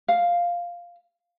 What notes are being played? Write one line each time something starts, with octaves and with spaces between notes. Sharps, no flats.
F5